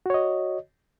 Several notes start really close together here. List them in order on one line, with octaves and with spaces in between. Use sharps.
F#4 C#5 D#5